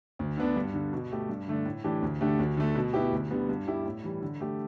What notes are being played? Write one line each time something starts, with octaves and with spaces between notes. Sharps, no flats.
D2
D3 B3 D4
G2
D3 G3
B2
A3 G4
G2
D3 A3 D4
A2
E3 A3 D4 G4
D2
D3 A3 D4 G4
D2
D3 A3
B2
B3 E4 G4
D2
D3 G3 B3
G2
G3 E4 G4
A2
E3 G3
D3
A3 G4